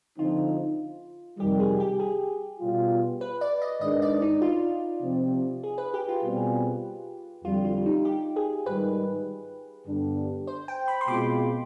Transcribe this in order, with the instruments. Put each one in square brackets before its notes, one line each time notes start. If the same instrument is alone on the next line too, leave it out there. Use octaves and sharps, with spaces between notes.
[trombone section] D3 F3 C4 D#4 [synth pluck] F4
[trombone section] F2 C3 D#3 G3 [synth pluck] G4
[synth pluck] G#4
G4
G#4
[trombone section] B2 G3 B3 F4
[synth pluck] B4
D5
D#5
[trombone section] G#2 D#3 G#3 D4 [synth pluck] D#5
[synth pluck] D5
D#4
F4
[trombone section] C3 F3 C4
[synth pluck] G#4
B4
G4
F4
[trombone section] B2 G3 C4 F4 G#4
[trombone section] F2 D3 G3 [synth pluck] F4
[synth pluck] F4
D#4
G4
G#4
[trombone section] G#2 D#3 G3 [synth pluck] B4
[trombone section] G2 D3 G3 B3 D4
[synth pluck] C5
G5
B5
C6
[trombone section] B2 G#3 C4 F4 [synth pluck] D6